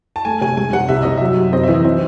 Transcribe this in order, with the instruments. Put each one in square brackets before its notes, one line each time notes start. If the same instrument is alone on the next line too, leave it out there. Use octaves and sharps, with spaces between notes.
[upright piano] A5
[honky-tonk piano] A3 [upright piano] G#5
[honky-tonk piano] C3 [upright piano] G#5
[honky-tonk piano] G#3 [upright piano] G#5
[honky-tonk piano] C3 [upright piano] F#5
[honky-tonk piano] C2 [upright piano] E5
[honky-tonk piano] C3 [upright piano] D#5
[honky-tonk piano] F#3 [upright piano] E5
[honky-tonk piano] F#2
[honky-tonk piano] C4 [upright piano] D#5
[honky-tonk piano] E3 [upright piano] E5
[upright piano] D#5
[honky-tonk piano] C4 [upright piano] E5